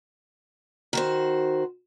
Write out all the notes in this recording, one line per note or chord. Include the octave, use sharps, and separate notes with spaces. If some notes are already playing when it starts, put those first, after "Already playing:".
D#3 F#4 C5